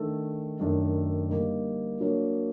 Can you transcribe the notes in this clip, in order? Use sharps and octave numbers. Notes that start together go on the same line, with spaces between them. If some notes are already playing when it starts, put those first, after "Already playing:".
Already playing: D#3 A3 D4 A4
F#2 D#3 A3 D4 A4
D3 G3 A#3 D#4
F#3 A#3 D4